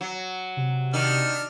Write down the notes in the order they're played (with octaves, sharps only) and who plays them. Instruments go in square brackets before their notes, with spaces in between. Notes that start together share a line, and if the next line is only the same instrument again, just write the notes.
[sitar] F#3
[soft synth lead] C3
[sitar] D#3 [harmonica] D4 F6